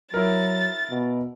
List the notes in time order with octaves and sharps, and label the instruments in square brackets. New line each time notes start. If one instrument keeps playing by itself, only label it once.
[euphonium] F#3 [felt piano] E4 A#4 [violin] A6
[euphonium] B2